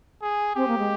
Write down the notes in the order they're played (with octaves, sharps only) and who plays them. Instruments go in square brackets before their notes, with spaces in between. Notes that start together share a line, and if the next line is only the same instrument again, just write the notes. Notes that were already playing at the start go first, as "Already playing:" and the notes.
[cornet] G#4
[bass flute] C4 [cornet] G4
[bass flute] A#3
G#3